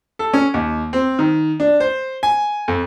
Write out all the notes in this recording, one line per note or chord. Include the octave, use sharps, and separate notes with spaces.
A4
C#4
D#2
C4
D#3
D4
C5
G#5
F2